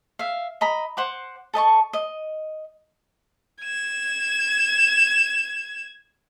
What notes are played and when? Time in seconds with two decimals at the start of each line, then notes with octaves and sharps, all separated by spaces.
0.19 E5 F5
0.61 D#5 A#5 B5
0.97 C5 F#5 D6
1.54 A4 D#5 A5 C#6
1.93 D#5
3.63 G#6 E7